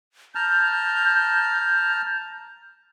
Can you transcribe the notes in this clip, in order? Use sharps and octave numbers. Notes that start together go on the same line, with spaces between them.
A5 A#5 F6 G6